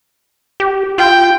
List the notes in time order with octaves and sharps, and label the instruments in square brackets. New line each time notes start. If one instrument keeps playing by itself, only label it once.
[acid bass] G4
[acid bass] F4 [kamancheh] G5